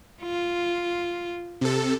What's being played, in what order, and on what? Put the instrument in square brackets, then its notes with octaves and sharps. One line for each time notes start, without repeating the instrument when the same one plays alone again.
[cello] F4
[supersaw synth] C3 A4